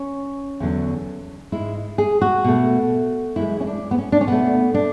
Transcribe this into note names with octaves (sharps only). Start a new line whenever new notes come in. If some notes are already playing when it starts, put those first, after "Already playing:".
Already playing: C#4
E2 D3 F#3
G#2 G#3 E4
G#4
F#4
B2 A3
F#2 E3 G#3 E4
C#4
D4
B3
C#4
D4
C#4
B2 A3 B3
D4